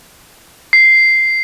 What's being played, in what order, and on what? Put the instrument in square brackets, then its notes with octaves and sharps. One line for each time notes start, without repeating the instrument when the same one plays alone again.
[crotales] C7